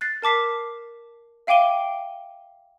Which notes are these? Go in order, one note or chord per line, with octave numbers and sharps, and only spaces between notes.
F#6 A6 C7
A#4 A5 D6 B6 C7
E5 F5 G5 D6 D#7 G7